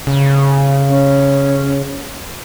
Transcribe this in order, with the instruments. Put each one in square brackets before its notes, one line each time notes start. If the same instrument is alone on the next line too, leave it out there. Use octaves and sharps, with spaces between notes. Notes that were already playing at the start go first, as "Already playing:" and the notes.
[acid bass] C#3
[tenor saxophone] C#4